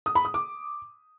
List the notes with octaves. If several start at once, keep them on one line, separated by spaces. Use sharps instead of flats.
D#6
B5
D#6
D6